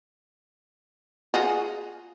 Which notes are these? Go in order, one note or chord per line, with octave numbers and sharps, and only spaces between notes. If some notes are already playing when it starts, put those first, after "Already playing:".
F4 F#4 G#4